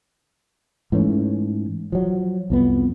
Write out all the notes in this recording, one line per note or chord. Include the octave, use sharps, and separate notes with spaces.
G#2 E3 A3 C#4
F3 F#3
C2 F2 B3